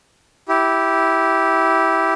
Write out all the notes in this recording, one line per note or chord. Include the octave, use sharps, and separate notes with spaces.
E4 G4